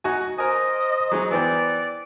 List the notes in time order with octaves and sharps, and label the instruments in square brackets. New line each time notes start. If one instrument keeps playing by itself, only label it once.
[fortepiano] D#4 F#4 G#5
[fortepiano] A#4 G#5 [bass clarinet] C5 [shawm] D#5
[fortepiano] F#3 G#3 D#4
[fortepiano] E3 B3 G5 [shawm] D5